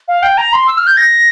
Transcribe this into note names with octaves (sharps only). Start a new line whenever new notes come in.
F5
G5
A#5
C6
E6
F6
G6
A#6